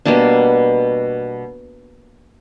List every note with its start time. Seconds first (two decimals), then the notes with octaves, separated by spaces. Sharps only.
0.06 B2 G3 A#3 D4